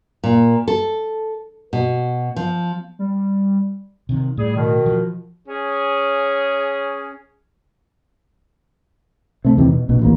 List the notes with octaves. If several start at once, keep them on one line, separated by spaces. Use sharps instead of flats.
A#2
A4
B2
F3
G3
C3 D#3
A2 G3 G#4
B2 D#3
F3
C#4 G#4
C3 A3
E2 C3 D#3
B2
A#1 B2
A1 D2 A#3